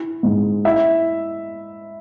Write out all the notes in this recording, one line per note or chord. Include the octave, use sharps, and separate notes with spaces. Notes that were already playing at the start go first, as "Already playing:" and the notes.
Already playing: E4
G#2
E4 E5